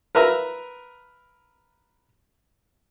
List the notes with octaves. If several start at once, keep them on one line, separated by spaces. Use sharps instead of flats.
A#4 B4 E5 A#5